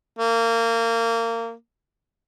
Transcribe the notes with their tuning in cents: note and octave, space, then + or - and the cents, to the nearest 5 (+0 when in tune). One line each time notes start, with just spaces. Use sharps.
A#3 -25